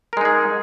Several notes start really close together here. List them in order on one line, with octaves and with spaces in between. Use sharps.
A#4 G#3 D#4 G#4